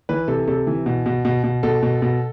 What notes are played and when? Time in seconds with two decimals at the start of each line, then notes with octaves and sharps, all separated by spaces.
0.09 E3 B4
0.28 C3 A4
0.48 C3 A4
0.67 E3
0.86 B2
1.06 B2
1.25 B2
1.44 B2
1.63 B2 A4
1.83 B2
2.02 B2